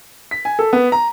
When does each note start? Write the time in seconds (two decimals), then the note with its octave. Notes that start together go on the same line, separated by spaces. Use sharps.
0.31 B6
0.45 G#5
0.59 A4
0.73 B3
0.92 A#5